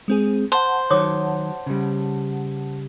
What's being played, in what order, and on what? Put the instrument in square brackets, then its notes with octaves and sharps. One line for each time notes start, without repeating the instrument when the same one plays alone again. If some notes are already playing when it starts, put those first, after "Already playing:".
[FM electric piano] G#3 C4 G#4
[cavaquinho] C5 [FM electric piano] F#5 A5
[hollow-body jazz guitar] D#3 F#3 [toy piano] C#5 D6 D#6
[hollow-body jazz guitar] C#3 G3